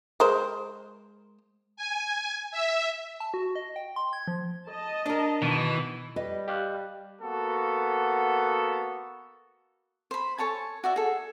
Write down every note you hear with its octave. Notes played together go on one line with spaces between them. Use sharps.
G#3 A#4 C5
G#5
E5
A5
F#4
D#5
G5
C6
G#6
F3
D#5 A5
D4 A#4
B2 D#3 E3
G3 B4 D#5
G4 F5 F#6
A#3 B3 F#4 A4
C5 B5
A4 C#5 G#5 A5
F#4 D5 E5
G#4 A4